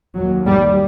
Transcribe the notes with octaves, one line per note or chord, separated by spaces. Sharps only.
D#2 F#3
G3